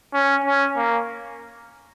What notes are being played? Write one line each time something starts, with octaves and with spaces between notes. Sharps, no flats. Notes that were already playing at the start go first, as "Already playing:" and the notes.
C#4
C#4
A#3